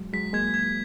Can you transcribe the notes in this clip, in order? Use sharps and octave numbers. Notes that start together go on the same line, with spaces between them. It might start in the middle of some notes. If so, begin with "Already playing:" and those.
Already playing: F#3 G#3
F#3 G#3 B6
G#3 A#3 G#6
G#6